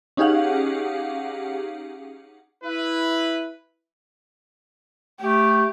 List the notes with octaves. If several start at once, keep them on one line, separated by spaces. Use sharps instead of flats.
C#4 D#4 G4 G#4 F5 F#5
E4 B4
A3 G4